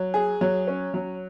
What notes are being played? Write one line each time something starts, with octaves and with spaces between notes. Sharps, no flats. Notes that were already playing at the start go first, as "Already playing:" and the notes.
Already playing: F#3
G#4
F#3
C#4
F#3